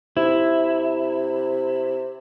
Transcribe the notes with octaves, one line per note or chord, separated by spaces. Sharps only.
C3 E4